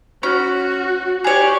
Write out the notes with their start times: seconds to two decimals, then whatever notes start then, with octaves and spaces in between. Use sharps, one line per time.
0.23 C#4 F#4
1.24 G4 G#4 C#5 D5